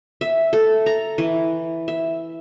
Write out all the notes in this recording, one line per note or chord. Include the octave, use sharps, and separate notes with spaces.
E5
A4
A#5
E3
E5